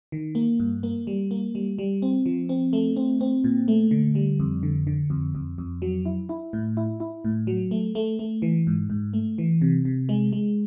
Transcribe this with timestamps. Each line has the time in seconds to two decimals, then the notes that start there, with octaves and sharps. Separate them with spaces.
0.12 D#3
0.35 A#3
0.60 G2
0.83 A#3
1.07 G3
1.31 A#3
1.55 G3
1.78 G3
2.02 C4
2.26 F3
2.49 C4
2.73 A3
2.97 C4
3.21 C4
3.44 A#2
3.68 A3
3.91 D3
4.15 G3
4.40 F2
4.63 D3
4.87 D3
5.10 F2
5.35 F2
5.58 F2
5.82 F#3
6.05 E4
6.29 E4
6.53 A2
6.77 E4
7.00 E4
7.25 A2
7.47 F#3
7.71 A3
7.95 A3
8.19 A3
8.42 E3
8.67 G#2
8.90 G#2
9.13 A3
9.38 E3
9.62 C3
9.85 C3
10.09 G#3
10.33 G#3